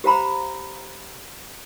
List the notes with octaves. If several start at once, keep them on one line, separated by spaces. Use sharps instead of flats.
G4 C5 F5 A#5 B5